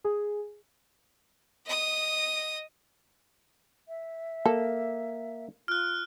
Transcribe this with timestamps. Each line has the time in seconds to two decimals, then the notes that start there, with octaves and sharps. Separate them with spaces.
0.04 G#4
1.66 D#5 D#6
3.88 E5
4.46 A#3 A4
5.68 F4 F6 F#6